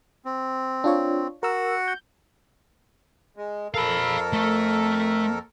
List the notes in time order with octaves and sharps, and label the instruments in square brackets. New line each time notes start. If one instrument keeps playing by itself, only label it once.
[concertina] C4
[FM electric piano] D4 F4 C#5
[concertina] F#4 F#5 [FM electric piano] A#4 E6
[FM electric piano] G6
[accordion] G#3
[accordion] F2 A4 A#4 [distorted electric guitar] F5 B5
[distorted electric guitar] A3